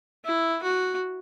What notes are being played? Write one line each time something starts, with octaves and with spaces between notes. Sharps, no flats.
E4
F#4